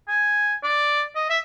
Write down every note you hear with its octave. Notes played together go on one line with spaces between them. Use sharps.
G#5
D5
D#5
E5